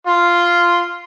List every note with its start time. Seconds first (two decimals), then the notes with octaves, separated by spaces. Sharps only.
0.07 F4 C6